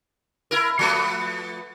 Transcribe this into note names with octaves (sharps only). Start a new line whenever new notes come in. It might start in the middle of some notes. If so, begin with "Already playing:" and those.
E4 A#4
F3 A3 B3